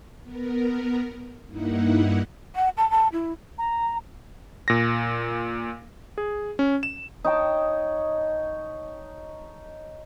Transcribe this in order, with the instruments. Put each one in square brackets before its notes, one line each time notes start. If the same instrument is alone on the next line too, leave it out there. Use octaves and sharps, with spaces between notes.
[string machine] B3 A#4
G2 A#3 D#4 E4 F#5
[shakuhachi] F#5
A5
A5
E4
[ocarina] A#5
[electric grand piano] A#2 A#6
G#4
C#4
E7
[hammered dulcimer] D#4 C#5 G5 A5